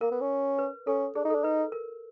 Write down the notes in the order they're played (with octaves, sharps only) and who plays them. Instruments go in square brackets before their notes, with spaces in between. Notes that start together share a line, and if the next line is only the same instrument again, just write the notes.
[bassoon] A#3 [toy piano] A#4
[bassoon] B3
C#4
[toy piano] B4
[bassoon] C#4 [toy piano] A4
[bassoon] D4 [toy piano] G#4
[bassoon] D#4
[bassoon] D4 [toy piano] A4
[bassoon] D#4 [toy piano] B4
[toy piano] A#4